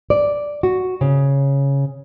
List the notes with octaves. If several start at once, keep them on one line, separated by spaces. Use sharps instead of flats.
D5
F#4
C#3